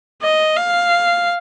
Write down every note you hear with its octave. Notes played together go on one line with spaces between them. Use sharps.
D#5
F5